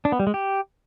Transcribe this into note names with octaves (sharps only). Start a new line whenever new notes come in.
D4
B3
G3
G#3
G4